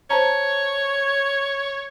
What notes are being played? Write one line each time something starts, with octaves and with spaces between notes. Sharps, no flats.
C5 C#5 A5 A#5